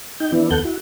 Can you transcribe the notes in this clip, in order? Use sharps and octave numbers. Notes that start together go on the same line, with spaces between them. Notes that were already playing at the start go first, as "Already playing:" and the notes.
D#4 G5
E3 B3 D4 E4
D#2 B3 A4 F#5 G6
E4 F#4